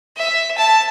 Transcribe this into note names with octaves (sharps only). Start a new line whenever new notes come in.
E5
A5